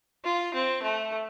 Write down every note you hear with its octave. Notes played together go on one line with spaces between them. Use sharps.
F4
C4
A3